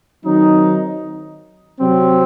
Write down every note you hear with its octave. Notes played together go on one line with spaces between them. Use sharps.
D#3 F#3 C4 D#4
C3 F#3 C4